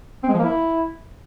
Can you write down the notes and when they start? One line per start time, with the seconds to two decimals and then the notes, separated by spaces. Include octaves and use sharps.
0.24 C4
0.29 G#3
0.34 F3
0.39 A#3
0.44 E4